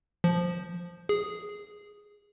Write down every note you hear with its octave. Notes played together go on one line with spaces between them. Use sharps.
F3
G#4